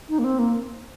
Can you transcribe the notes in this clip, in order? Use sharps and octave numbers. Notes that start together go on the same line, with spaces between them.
D#4
A#3
C4
A#3